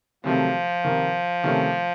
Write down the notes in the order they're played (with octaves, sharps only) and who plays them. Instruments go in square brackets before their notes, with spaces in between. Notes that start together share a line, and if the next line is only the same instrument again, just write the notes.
[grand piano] C2 C3 D#3 F#3 A3 [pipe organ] F3
[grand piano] C3 D#3 A#3
C3 D#3 A3 C#4